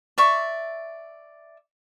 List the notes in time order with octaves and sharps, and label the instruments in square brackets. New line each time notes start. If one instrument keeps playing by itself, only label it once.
[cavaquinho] D5 E5 C#6